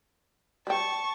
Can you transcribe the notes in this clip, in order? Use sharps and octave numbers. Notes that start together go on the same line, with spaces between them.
G3 G5 A5 C#6